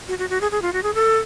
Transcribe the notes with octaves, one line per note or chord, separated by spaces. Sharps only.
F#4
F#4
F#4
G#4
G#4
F4
F#4
G#4
A4